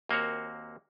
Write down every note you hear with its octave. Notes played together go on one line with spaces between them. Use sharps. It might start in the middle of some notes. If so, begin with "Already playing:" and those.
D#2 A#3 C4 F#4 C#5